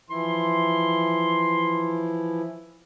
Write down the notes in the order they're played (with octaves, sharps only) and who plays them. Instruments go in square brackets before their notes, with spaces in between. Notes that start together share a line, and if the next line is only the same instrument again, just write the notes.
[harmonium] E3 F3 E4 [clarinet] C6